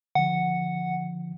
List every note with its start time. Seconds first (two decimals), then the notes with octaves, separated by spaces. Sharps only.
0.15 D3 F3 F#5